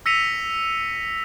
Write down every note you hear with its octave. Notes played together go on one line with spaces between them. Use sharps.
E6 A#6 B6 C#7 D#7 F7